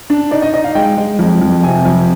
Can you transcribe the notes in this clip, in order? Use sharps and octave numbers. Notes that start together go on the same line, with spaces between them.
D4
D#4 D5
D#5
D#4 D#5
F5
G#3 G5
G#3
F2
F2
C3 G#5
F2